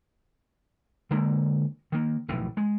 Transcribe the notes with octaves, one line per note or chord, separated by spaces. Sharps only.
D3 G#3 A#3
D#3 A#3
F1 B1 A2 E3
G#3